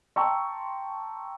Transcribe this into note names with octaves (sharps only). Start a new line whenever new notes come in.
G5 A5 A#5 C6 C#6 E6